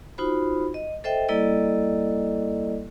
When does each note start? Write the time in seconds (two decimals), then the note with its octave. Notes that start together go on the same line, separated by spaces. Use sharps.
0.18 D#4 F4 F#4 C5 B5
0.74 D#5
1.04 A4 C5 D#5 E5 G5
1.29 G3 A#3 E4 A4 D5 D#5